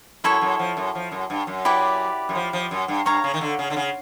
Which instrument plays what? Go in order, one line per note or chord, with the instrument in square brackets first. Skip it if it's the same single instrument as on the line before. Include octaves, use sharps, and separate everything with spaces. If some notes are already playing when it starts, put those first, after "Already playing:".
[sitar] F#2 [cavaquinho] E4 A4 C#5
[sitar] F#2
F3
F#2
F3
F#2
G2
F#2
[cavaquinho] E4 G4 B4 D5
[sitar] F#2
F3
F3
F#2
G2
[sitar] G2 [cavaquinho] C#5 F5 A#5
[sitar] C#3
D#3
D3
C#3
D3
C#3